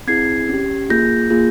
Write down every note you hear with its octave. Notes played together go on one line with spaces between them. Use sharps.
C4 E4 G#4 G#6 C7
C#4 G4
A#3 F4 G#4 G6 A#6
A#3 F4 G#4